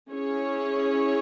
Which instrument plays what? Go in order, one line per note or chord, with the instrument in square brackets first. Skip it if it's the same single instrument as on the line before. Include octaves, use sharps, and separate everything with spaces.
[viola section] C#4 E4 G#4 C#5